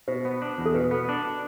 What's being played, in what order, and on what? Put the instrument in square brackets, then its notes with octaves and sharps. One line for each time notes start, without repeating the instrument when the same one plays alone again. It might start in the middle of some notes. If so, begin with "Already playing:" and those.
[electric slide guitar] B2 [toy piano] C5
[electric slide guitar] B3
D4
E2
[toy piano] A4
[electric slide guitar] B2 [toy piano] B4
[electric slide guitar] B3
D4